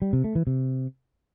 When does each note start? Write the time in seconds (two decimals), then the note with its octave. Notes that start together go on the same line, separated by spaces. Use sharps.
0.02 G3
0.13 C3
0.24 A3
0.35 E3
0.47 C3